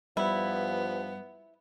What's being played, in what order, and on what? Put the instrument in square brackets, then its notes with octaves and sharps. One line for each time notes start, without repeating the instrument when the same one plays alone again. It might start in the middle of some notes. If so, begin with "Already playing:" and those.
[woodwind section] G2 F3 [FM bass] G3 [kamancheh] B3 [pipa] E4